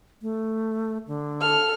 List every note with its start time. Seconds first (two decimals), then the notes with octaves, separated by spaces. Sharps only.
0.22 A3
1.07 D3
1.40 A4 F6